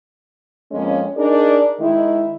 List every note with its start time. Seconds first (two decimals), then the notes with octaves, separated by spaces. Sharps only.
0.72 F2 G#3 A#3 C#4
1.17 D4 D#4 G#4 A#4 D5
1.80 D#3 G#3 E4